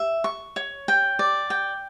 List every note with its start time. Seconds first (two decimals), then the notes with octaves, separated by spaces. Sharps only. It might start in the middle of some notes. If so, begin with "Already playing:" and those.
Already playing: E5
0.24 C#6
0.56 C#5
0.88 G5
1.19 D5
1.50 G5